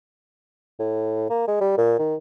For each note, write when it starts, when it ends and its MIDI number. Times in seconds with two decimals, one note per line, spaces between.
0.79 1.29 45
1.30 1.44 58
1.48 1.58 56
1.61 1.75 55
1.77 1.96 46
1.99 2.15 51